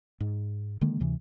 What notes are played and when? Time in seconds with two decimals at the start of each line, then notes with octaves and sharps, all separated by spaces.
0.20 G#2
0.81 D3 D#3 G#3 A#3
1.00 D2 C3 E3